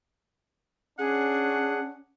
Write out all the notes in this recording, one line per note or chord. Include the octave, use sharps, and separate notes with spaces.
C#4 D4 G#4 F#5